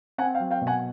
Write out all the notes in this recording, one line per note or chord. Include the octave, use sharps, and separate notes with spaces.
C4 F#5 G#5
F5 G5
F#3
F5 G5
B2
F#5 G#5